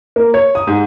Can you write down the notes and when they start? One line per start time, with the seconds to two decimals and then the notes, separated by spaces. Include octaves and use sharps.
0.16 A#3
0.34 C#5
0.55 D#6
0.67 G#2